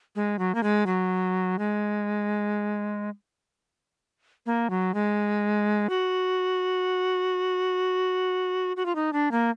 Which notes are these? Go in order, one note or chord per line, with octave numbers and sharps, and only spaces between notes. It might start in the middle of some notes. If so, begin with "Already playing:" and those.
G#3
F#3
A#3
G#3
F#3
G#3
A#3
F#3
G#3
F#4
F#4
F4
D#4
D4
A#3